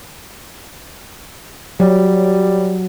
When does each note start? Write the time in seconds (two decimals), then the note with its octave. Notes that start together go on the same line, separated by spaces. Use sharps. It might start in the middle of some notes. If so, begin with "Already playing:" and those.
1.80 F#3 G3